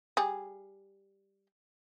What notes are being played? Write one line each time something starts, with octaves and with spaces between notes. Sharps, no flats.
G3 G#4